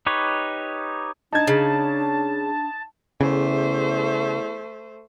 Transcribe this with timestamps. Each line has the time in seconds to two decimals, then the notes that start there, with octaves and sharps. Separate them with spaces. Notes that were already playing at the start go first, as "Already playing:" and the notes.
0.06 D#4 G4 B4 C#5
1.32 D4 D#4 A5 G#6
1.47 C#3
3.21 E2 C#3 A3 C5